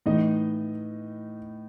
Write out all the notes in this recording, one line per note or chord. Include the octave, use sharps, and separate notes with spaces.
A2 E3 D#4 D#5